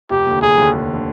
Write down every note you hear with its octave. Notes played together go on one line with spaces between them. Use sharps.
F1 G4
D#2 D3
F1 G#4
D#2 D3
F1
D3